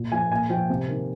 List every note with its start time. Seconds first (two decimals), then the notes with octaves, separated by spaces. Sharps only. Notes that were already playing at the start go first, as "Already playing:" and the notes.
Already playing: A#2
0.12 F3 G#5
0.31 A#2 G#5
0.50 F3 G5
0.70 C3
0.88 D#3